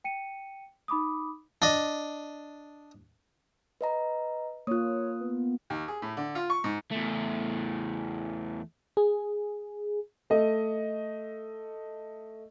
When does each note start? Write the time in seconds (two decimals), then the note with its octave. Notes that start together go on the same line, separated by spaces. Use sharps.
0.04 G5 C#7 D#7
0.88 D#4 B5 D6 D#6
1.62 D4 D#5
3.81 B4 D#5 A#5
4.67 A#3 F4 C#5 D#6 F#6
5.21 B3
5.70 D#2
5.88 G#4
6.02 A2
6.17 D3
6.35 F4
6.50 C#6
6.64 G#2
6.92 E2 A3
8.97 G#4
10.30 A3 D#5